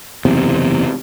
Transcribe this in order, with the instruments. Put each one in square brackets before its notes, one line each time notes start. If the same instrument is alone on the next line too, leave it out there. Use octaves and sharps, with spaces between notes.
[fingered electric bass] F#1 E2 C3